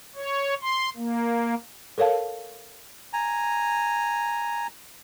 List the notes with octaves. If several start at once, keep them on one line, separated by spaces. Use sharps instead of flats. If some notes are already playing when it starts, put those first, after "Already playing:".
C#5
C6
A#3
A4 A#4 C#5 F5 A5
G#5 A#5